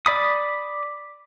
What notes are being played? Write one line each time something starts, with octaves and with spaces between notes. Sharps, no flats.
D5 B5 D#6